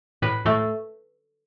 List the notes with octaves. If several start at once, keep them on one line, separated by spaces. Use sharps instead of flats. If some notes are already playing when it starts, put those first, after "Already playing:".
A2 B4
A2 A3